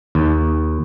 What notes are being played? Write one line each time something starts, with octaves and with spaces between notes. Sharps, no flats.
D#2